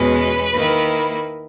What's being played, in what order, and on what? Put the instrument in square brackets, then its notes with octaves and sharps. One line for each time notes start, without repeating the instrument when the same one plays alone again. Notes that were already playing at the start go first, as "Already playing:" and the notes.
Already playing: [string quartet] E2 B2 G#3 C#4 B4
D#3 A#3 E4